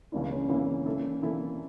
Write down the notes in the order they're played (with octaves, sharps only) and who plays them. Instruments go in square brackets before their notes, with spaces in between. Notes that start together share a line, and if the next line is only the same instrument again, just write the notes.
[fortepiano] C#2 C#3 E3 A#3 E4 [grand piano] D4
[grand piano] C#4
[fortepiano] C#2 C#3 E3 A#3 E4
E3 A#3 E4 A4
E3 A#3 E4 A4